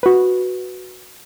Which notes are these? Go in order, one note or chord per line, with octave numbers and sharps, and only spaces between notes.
F#4 B4